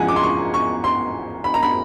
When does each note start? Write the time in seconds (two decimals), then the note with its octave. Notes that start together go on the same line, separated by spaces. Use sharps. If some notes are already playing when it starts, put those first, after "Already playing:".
Already playing: E2 C#3 F3 G#3 F#5 G#5
0.08 D6
0.16 C6
0.23 C#6
0.54 C#6
0.84 C6
1.44 B5
1.54 A#5
1.63 B5